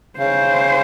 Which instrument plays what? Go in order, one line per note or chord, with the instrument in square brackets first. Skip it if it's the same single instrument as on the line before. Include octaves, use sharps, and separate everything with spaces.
[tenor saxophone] C#3 [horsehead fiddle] C5